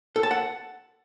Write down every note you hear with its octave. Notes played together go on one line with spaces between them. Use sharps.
A4
A5
F#5